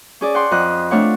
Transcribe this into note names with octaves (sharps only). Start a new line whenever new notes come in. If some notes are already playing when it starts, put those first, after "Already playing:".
C#4 G#4 D5
F#5 G5 C6
F2 D#5 F#6
A3 C4 D4 F4 C#5 F#5